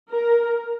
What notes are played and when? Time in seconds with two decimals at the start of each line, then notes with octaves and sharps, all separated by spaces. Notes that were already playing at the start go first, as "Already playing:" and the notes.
0.11 A#4